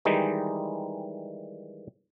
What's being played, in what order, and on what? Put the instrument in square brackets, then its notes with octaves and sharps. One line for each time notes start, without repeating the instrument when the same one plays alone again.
[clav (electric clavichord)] D#3 E3 G3 G#3 D#4